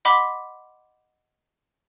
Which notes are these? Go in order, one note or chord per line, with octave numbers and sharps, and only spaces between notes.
D#5 F#5 B5 C6 D6 B6